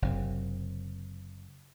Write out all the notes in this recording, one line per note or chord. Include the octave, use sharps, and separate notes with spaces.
F#1 C3